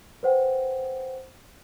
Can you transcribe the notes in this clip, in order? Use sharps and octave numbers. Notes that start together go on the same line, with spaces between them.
B4 C5 F#5 G5